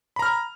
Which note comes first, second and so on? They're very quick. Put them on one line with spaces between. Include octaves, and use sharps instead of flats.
B5 A#5 F6